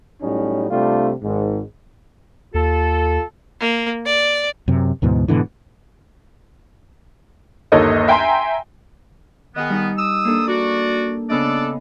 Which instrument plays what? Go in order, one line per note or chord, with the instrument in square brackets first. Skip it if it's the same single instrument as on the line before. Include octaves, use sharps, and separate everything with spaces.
[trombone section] A2 F#3 G3 C#4 D#4
C3 G3 A3 D4 F4
G#1 G#2
[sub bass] D#2 [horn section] F4 A4
[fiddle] A#3
D5
[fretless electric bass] F#2 C3
D2 G#2 B2 E3
G#2 B2 D3 E3
[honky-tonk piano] G1 D#2 A#3 A4 C#5 D#5
E5 G5 G#5 A#5 C6
[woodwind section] D#3 B3 [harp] G#4 D#5
[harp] G3 D#4
[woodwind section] D#6 E6
[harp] A#3 D4 A4
[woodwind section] F#4 D5
[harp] C#3 B3 D#5 [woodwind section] D4 A4 D5